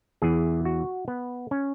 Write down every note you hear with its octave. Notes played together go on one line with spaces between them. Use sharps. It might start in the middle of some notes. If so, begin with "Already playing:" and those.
E2 E3 G#4
F#4
B3
C#4